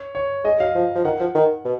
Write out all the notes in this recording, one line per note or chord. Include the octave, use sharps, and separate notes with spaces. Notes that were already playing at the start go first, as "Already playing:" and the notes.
Already playing: C#5
C#5
G#3 D#5
F#3 F5
F3
F3
D#3 F#5
F3
D#3
B2